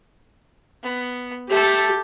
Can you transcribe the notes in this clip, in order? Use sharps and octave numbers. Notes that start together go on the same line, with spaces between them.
B3
A3 G4 A4